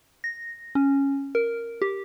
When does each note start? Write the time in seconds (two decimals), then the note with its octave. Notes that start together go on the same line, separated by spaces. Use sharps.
0.24 A#6
0.75 C#4
1.35 A#4
1.82 G4